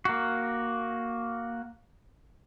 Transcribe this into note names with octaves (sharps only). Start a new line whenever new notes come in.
A#3 F#4